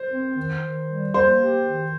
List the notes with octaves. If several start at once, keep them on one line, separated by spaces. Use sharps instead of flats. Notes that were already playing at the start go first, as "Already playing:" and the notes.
Already playing: C5
C4
D#3
D#3
G3
A#3 C5
G4
D#3